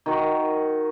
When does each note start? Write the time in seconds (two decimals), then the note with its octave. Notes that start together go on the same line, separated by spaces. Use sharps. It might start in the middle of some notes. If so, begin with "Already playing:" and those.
0.06 D#3 F#4